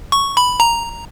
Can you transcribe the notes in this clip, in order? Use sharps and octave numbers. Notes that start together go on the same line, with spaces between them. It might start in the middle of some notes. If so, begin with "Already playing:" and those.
C#6
B5
A#5